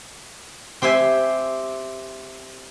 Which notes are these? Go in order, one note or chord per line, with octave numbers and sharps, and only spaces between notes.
C4 G4 C5 E5 G#5